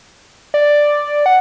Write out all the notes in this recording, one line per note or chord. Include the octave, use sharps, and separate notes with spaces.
D5
F#5